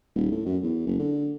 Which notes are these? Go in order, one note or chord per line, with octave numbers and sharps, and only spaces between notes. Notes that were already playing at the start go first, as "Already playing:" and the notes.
D#1
A2
F#2
E2
F#1
D3